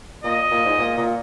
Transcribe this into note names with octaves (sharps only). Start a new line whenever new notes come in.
A#2 D#5
A#2
G#2
A#2
A#2